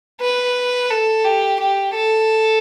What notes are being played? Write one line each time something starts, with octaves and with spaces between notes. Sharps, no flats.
B4
A4
G4
G4
A4